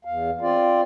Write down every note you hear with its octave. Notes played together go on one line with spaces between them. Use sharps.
E2 F5
C4 F4 D5